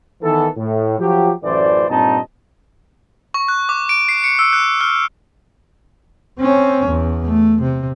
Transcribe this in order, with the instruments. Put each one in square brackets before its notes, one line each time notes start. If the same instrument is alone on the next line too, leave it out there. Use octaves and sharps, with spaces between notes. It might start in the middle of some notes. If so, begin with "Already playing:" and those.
[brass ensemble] D#3 E3 B3 A4
A2
F3 F#3 G4
A1 F#2 E3 A3 C5 D5
G2 A#2 C4 D#4 D#5 A5
[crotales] C#6
F#6
D6
D7
C7
C#7
E6
F#6
F6
[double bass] C4 C#4
E2
A3
C3